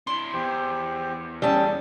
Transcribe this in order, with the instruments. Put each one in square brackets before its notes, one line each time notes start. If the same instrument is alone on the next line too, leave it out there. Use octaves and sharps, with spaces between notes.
[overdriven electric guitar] D4 E4 [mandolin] C6
[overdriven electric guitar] E2 [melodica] G4 C5
[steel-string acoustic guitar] G3 C#4 [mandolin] A3 A5 [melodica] G#4 G5